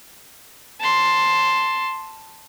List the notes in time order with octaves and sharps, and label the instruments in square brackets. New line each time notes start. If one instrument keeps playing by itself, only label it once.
[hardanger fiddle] A5 C6